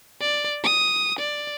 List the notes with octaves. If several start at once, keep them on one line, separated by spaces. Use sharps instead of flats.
D5
D#6
D5